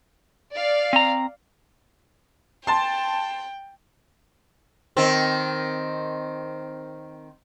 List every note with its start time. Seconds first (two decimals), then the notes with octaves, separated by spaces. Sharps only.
0.53 D5 F5
0.93 C4 A#5
2.67 G5 A5 C6
4.97 D#3 C4